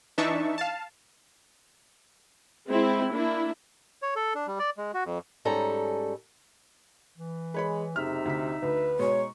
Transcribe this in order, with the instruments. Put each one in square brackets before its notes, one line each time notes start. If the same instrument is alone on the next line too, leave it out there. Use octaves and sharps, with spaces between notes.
[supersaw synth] E3 D4 D#4 E5 A5 C#6
F5 A5
[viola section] G#3 C4 E4
A#3 D4 E4
[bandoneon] C#5
A4
D4
G3
D5
G#3
F#4
F2
[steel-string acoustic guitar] G#2 G3 C#4 A4 A#5
[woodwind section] E3
[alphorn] G#3 [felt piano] B4 C#5 B5
[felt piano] F#1 F6 [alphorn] C3 [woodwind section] D#4 E5
[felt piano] D2 B6
[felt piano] D2 [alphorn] B4
[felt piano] B2 G#3 [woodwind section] D#4 C#6 [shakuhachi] C#5